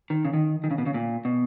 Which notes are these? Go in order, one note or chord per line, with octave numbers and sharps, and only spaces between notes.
D#3
C#3
D#3
D#3
C#3
B2
C#3
A#2
B2